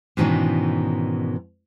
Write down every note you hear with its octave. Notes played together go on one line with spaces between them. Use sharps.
G#2 B2 D#3 E3 C#4 D4